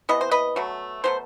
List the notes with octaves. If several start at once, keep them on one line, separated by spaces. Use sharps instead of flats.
C3 E3 B3 D#5
C5
B4 D#5
B2 F#3 A3
B2 F#3 A3 C5